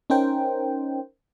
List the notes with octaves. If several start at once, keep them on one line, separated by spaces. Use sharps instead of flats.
C#4 D#4 A#4 C5 G5